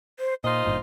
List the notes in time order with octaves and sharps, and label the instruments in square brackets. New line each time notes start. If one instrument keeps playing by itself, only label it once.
[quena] C5
[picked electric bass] A#2 [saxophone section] D#4 F4 D#5 [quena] C5
[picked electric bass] G#1 G2 A#2